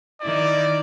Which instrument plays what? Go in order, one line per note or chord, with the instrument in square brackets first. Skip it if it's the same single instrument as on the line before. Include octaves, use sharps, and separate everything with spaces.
[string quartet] D#3 E4 [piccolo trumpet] D5